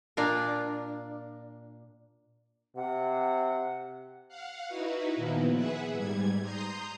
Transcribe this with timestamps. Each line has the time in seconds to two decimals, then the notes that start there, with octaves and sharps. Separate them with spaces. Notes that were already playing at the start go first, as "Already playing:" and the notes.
0.17 A#2 D4 F4 A#4
2.76 C3 F#5
4.28 F5 F#5
4.68 D#4 E4 F#4 B4
5.16 A#2 D#3 F3 B3 E4
5.54 G#4 B4 E5 F#5
5.93 G#2 G3 G#6
6.41 A#5 C6 D#6 G6